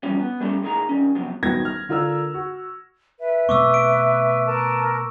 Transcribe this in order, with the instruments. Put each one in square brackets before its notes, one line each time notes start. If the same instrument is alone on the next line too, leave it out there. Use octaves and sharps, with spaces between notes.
[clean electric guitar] G2 E3 F3 G3 C#4
B3
G3 A3 B3 C#4 G4 A4
D#2 A2 D#3 G#4 A#5
D#3 C#4
F2 C3 F#3 B3
[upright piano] D#1 D#3 F#3 B3 G#6 A#6
F6
D3 F4 A#4 E6 F6
F#4
[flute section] B4 E5
[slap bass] B2 A3 C4 [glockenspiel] C#6 D6 E6
[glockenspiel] D7
[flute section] A#4 B4 A5